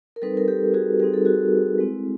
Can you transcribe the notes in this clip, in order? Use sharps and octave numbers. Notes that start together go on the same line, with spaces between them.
A#4
G3 C4 D#4 A4 B4
A#4
G4 A4
F#4 G#4
G3 C4 D#4 G#4
A4
F#4 G#4
G#3 C4 E4